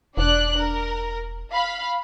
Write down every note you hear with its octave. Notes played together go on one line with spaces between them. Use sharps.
E1 D4 D5 F#6
A#4
F5 B5